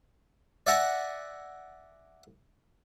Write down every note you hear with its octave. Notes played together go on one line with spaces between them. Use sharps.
D5 E5 F#5 G#5 A#5